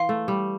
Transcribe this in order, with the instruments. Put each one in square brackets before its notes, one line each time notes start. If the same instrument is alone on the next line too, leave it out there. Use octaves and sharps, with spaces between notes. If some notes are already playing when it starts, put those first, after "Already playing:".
Already playing: [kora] E3 [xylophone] F5 C6
[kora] A3
G3